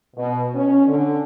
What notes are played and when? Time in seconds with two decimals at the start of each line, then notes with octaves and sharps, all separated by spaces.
0.17 B2
0.55 C#4
0.87 D3